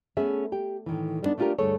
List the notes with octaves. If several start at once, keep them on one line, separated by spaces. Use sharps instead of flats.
A3 B3 C#4 G#4 E5
G4 G5
A2 D#3 E3
G3 A#3 B3 D4 D#4
A3 B3 D4 F4 G4 A#4
D2 G2 A3 G#4 A4 C#5